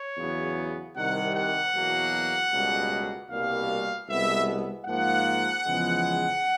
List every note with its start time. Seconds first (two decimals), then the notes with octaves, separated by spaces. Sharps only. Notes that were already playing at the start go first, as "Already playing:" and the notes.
Already playing: C#5
0.17 E2 C#3 F#3 B3
0.95 C2 C3 D#3 G3 F#5
1.35 F#5
1.73 E2 B2 F#3 A#3
2.51 C#2 B2 G3 A#3
3.29 C2 B2 G3 A#3 F5
4.08 C2 B2 G#3 B3 E5
4.86 G#2 F3 A#3 F#5
5.64 E2 C#3 F3 G#3 B3